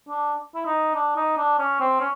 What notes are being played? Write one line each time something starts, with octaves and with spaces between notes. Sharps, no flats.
D4
E4
D#4
D4
D#4
D4
C#4
C4
C#4